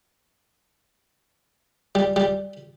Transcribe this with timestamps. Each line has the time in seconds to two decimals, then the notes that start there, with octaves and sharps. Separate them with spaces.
1.95 G3
2.16 G3